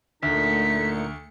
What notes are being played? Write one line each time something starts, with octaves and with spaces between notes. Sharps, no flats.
D2 A#2 D3 A3 D#4 B6 C#7